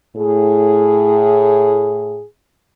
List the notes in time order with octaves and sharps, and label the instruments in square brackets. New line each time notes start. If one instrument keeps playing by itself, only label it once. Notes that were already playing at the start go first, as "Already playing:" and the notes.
[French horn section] A2 G#4